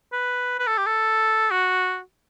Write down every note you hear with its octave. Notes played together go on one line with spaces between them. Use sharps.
B4
B4
A4
G4
A4
F#4